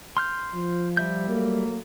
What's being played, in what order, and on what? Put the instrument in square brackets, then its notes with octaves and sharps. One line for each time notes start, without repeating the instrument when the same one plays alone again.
[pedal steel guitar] C6 F6 G6
[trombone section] F3
[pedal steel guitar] G3 E5 G6
[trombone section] F#3 A3 A#3